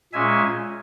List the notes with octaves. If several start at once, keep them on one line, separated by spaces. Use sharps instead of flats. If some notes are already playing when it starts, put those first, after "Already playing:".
A#2 G#3 C#4 E5 G#5